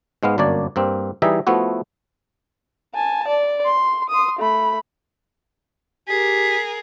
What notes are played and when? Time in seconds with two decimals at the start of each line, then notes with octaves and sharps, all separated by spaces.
0.23 G#2 G#3 B3 F5
0.38 G1 F#2 A#3 D4 C#5 D5
0.76 G2 A#3 C4
1.22 E3 G3 D#4 G#4 D#5 E5
1.47 F3 A3 B3 E4 F#4
2.95 G#5 A5
3.28 D5
3.65 C6
4.10 C6 D#6
4.39 A3 B5
6.08 G4 G#4 A#4 B6